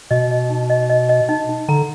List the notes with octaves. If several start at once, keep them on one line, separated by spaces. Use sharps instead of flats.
B2 D#5
D#5
D#4
D#5
D#5
D#5
D#4
D#4
D3 A#5